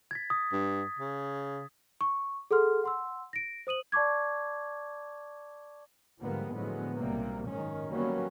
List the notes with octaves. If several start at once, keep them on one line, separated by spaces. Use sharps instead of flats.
G#6 A6 B6
D#6
G2
C#3
C#6
G#4 A4 F#5 C6 F6
F#5 C6 E6
A#6 D7
C5 D#6 D#7 F#7
D5 A5 C#6 D6 G#6
G#2 D3 F3 G3 A#3 B3
A2 D3 F3 F#3 G#3 B3
B1 C3 G3 A#3
F#1 G#2 D#3 C#4
D3 F#3 G3 A#3 B3 C#4